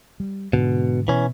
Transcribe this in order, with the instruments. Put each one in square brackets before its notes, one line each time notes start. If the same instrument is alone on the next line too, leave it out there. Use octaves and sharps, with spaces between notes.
[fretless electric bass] G3
[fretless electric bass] G#2 D3 [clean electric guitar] B2
[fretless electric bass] B2 [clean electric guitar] E3 C#4